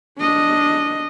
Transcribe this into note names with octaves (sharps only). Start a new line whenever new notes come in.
D4 D#5